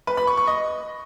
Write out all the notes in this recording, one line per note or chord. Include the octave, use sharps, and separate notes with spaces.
B4
B5
C#6
C#6
D#5